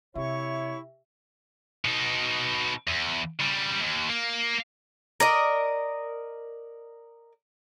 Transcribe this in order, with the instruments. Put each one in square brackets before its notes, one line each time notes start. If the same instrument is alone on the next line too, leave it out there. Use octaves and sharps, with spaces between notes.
[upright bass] C3 [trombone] E4 [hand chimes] G4 E5 [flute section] C#5 C#6
[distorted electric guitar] B2 D#4
E2
C#3 G3
D#2
A#3
[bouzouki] A#4 D5 D#5